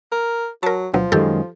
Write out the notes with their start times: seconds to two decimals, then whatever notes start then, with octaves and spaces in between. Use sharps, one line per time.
0.12 A#4
0.63 F#3 A#4 A5
0.94 D2 B2 F3 F#3
1.12 F#2 D#3 G#3 G4 A4